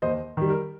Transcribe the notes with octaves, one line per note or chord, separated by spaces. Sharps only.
D#2 C5 D#5
D#3 G3
A#4